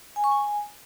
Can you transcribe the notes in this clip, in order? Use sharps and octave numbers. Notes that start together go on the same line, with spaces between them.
G#5
C#6
G#5